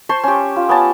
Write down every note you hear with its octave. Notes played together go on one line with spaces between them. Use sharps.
C5 A5 C6 C#6
C#4 G4
F4
B3 C#4 A5